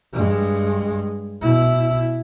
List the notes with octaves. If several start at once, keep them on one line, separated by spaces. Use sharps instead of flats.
G2 G#3
B2 E4